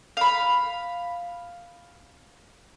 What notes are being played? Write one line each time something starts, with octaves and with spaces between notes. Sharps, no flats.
F5 B5